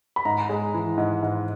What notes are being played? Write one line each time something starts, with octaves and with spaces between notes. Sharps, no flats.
B5
G#2 A#5
G#3
E3
G#2
G#2